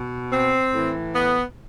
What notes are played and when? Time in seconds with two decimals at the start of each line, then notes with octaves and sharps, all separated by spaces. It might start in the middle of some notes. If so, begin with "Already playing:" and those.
Already playing: B2
0.32 C4
0.73 A2 E3
1.15 B3